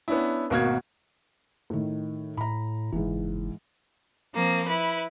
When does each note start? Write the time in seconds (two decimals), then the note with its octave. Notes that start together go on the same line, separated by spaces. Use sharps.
0.08 B3 C#4 D4 E4
0.50 G#1 B2 A#3 F#4 F6 G#6
1.70 A2 D#3
2.37 A2 A#5 B5
2.92 F#1 G#2 E3
4.34 F3 A#3 C4
4.68 E4 B4